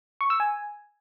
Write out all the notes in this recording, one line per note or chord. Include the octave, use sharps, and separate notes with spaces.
C#6
E6
G#5